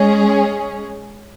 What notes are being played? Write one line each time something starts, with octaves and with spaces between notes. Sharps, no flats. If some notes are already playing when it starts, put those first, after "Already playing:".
Already playing: G#3 C#4 G#4